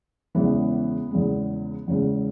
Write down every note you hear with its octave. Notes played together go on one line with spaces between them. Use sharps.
E2 C#3 E3 G#3 B3
E2 C#3 G#3
E2 C#3 G#3